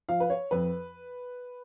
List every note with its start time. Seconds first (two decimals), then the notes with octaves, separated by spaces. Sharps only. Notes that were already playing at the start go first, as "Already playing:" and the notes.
0.09 F3 F5
0.20 B4
0.30 C#5
0.51 F2 B4